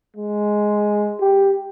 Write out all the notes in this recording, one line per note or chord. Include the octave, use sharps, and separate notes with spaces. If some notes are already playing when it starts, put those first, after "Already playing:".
G#3
G4